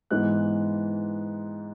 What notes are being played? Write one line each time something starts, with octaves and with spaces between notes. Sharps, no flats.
G#2 E3 G#3 B3 F#6